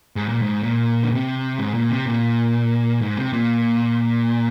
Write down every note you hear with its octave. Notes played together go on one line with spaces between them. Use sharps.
G#2
A#2
G#2
A#2
D3
C3
G#2
A#2
C3
A#2
G#2
C3
A#2